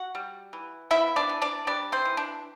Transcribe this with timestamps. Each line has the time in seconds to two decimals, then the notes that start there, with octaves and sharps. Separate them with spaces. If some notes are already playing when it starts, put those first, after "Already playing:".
Already playing: F#4 F#5
0.15 G3
0.53 E3
0.91 B3 E4 E5
1.16 D4 D5
1.29 E3
1.42 D4 D5
1.67 G3 D4 D5
1.92 C4 C5
2.05 E3
2.17 D4